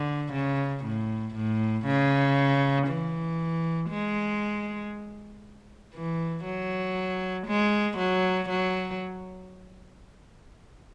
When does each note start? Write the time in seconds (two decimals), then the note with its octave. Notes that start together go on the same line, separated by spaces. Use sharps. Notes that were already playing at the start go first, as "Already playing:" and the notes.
Already playing: D3
0.33 C#3
0.85 A2
1.35 A2
1.86 C#3
2.88 E3
3.90 G#3
5.94 E3
6.45 F#3
7.47 G#3
7.98 F#3
8.49 F#3